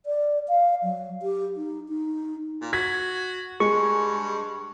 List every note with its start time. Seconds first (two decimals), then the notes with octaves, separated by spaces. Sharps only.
0.06 D5
0.48 F5
0.83 F#3
1.22 G4
1.56 D#4
1.89 D#4
2.61 A#2
2.73 F#4 G#6 B6
3.60 G2 G#3 C#6